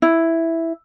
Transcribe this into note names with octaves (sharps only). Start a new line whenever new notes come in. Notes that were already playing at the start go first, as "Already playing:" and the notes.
E4